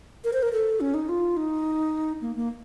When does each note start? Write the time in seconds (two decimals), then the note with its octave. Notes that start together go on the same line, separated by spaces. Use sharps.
0.24 A#4
0.33 C5
0.42 A#4
0.53 A4
0.80 C#4
0.94 D#4
1.09 F4
1.37 D#4
2.21 A#3
2.36 A#3